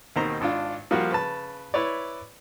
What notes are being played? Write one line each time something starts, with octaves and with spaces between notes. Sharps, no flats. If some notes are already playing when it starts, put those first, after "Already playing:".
D#2 B2 D#3 C4 C5 A#5
G#1 D4 F4
F3 G3 A#3 F4 F#4
C#3 B4 A5
E4 B4 C#5 D5